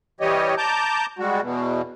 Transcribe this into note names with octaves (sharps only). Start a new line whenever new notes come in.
E3 G3 G4 C#5 D#5
A5 A#5 D6 G6
G3 G#3 F#4
E2 B2